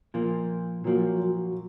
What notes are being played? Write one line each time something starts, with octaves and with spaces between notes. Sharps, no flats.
A#2 F3 A#3
A#2 F3 F#3 A#3
F#3